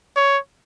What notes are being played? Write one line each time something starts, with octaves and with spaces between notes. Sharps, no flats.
C#5